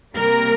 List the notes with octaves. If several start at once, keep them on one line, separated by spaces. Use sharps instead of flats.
C3 G3 A#3 A#4